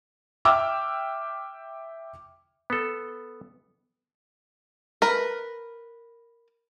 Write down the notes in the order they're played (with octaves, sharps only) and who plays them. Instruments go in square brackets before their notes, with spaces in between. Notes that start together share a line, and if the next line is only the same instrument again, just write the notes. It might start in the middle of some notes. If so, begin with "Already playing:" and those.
[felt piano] E5 G5 D6 E6 F6
[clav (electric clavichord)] B3 A4
[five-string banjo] A#4 B4